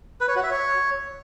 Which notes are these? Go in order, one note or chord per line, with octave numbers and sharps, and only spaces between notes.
B4
C#5
F#4
E5
C#5